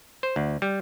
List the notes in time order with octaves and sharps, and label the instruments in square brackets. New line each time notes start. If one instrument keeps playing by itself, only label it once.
[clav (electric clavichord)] C5
D2
G3